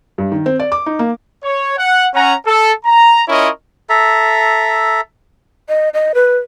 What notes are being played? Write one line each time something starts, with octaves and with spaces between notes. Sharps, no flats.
G2
D#3
C4
D5
D6
D#4
A#3
C#5
F#5
C#4 F#5 A#5
A4
A#5
C#4 E4 F4 A#4 C#5 D#5
A4 E5 A#5
D#5
D#5
B4